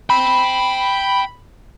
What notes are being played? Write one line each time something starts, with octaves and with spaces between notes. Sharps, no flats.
G5 B5 C6